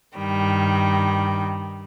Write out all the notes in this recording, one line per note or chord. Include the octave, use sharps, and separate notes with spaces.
G2 D#3 G3